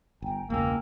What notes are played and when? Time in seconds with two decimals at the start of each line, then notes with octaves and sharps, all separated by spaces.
0.22 G1 G5 G#5 A#5
0.50 E1 C#2 A#3 G5 G#5 E6